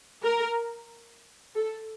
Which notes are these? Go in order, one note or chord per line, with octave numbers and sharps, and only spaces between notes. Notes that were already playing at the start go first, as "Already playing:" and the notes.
A#4
A4